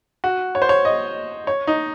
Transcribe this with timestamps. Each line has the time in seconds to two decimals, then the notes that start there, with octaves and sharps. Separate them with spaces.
0.24 F#4
0.55 C#5
0.62 C5
0.69 C#5
0.85 D#5
1.47 C#5
1.67 D#4